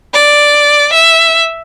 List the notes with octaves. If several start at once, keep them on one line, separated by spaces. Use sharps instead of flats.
D5
E5